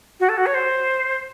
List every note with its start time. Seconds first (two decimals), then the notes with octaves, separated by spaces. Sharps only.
0.20 F#4
0.29 A4
0.37 F#4
0.46 C#5
0.54 C5